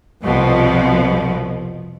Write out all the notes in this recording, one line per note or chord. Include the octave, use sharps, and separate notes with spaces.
C2 F2 B2 F3